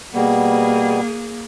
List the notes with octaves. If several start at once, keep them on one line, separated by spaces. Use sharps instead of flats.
B2 G3 A#3 B3 G#4